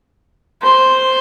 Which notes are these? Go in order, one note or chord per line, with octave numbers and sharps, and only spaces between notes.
C5